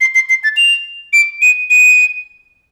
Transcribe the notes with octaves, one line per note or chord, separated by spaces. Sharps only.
C7
C7
C7
A6
F7
D7
D#7
D#7